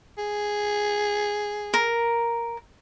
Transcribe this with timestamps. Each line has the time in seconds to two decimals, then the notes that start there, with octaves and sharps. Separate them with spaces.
0.18 G#4
1.74 A#4